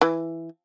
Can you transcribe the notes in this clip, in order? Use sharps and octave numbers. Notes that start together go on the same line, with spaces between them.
E3